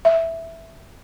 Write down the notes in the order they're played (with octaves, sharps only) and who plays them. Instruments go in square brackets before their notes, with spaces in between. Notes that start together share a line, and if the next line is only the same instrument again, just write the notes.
[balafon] E5